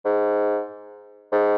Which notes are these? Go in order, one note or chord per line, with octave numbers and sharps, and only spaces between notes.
G#2
G#2